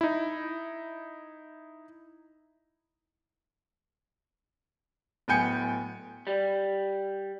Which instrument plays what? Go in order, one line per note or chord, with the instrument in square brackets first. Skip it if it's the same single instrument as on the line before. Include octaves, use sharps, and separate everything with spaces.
[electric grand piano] D#4 E4
[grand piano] D1 B3 G5 G#5 G6 C#7
[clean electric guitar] G3